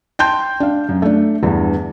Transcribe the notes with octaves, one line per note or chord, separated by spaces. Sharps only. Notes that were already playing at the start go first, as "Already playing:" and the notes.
G5 A5 C6 G6
D4 F5
F#2
A3 D4
E2 G2 D3 E3